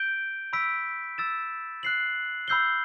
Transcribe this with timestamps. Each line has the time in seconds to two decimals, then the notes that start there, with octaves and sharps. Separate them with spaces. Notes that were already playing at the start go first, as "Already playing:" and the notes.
Already playing: G6 D7 G7
0.53 B5 E6 B6 D7
1.18 E6 A6 E7
1.83 F#6 C7 F#7
2.48 B5 E6 G6 C7 G7